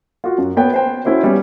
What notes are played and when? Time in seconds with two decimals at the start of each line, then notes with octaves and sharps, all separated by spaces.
0.24 F4 F#4
0.38 F#2
0.57 B3 B4 C#5 G5
0.74 C5 G5
1.05 C#4 E4 F#4 C5
1.23 G3 B3 C#4